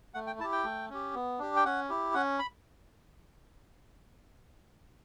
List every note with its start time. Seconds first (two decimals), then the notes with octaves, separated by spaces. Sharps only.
0.14 A3 F#5
0.27 G5
0.39 E4 A5
0.44 G4
0.52 G5
0.64 A3
0.90 C#4 G4
1.14 B3
1.39 D4 G4
1.56 G5
1.65 C#4 F#5
1.90 E4 G4
2.14 C#4 F#5
2.39 B5